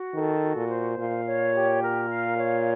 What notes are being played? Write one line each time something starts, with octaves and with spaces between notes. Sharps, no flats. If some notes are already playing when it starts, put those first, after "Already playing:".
Already playing: F#4
D#3 A4
F#4
A#2
C5
A#2 F5
C#5
G4
A#4
F5
C#5